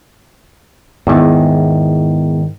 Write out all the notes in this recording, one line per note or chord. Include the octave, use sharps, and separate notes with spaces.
E2 G#2 D#3